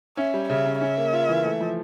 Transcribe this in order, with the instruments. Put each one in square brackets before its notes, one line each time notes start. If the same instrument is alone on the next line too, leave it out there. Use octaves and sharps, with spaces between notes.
[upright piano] C#4 [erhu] E5
[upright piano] G3
[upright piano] C#3 [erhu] E5
[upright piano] C#3
[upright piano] C#4 [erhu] E5
[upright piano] A#3
F4
E3
A3
F3